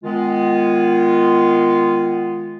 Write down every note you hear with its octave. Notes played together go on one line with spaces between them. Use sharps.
D#3 G#3 B3 F4